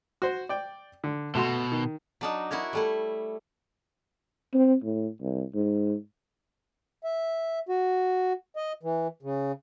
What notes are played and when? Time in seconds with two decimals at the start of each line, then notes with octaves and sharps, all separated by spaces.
0.22 F#4 C5
0.49 D5 G5
1.04 D3
1.35 B2 A3 F#4 C6
1.72 D#3
2.21 F#3 D4 D#4
2.51 E4 F#4 A#4 C#5
2.73 G3 A3 E4
4.54 C4
4.83 A2
5.21 C2
5.54 G#2
7.04 E5
7.69 F#4
8.56 D#5
8.83 E3
9.23 C#3